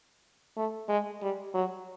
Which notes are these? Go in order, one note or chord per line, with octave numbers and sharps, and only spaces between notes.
A3
G#3
G3
F#3